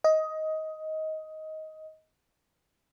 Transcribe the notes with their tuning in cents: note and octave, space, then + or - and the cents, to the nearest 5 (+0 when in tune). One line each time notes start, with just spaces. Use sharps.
D#5 +15